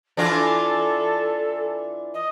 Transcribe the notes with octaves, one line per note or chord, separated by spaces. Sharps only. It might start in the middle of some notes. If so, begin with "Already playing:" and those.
E3 D4 F4 A4
D#5